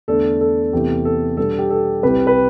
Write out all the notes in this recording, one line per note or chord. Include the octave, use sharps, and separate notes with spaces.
E2 D3 A3 D4 A4
A4
E2 C3 E3 A3 G4
A4
B2 G3 B3 D4 A4
G4
A4
C2 C3 G3 C4 E4 G4 B4
B4